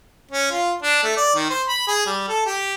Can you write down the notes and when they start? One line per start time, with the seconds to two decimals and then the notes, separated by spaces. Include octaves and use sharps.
0.31 C#4
0.51 F4
0.82 D4
1.03 A3
1.17 D5
1.35 D#3
1.50 C5
1.68 B5
1.88 G#4
2.06 G3
2.28 A4
2.46 G4